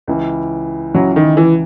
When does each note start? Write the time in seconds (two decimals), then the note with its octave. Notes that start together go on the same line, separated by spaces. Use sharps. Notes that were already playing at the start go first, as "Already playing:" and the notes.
0.07 C#2 C#3 E3
0.94 C#2 C#3 E3 F#3
1.16 D#3
1.37 E3